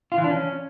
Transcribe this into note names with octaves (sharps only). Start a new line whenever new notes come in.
F4
E3
D4
C#4